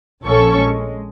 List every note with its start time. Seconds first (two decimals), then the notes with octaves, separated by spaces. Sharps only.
0.24 A#1 F3 C#4 A4 C#6
0.59 G#3